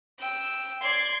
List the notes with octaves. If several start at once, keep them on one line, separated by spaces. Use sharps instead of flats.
G5 E6
D5 C6 G#6